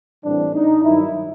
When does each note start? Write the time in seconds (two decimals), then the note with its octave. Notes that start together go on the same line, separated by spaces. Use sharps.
0.24 A2 E3 G3 C4 D4
0.54 D#4
0.84 G2 D#3 F#3 E4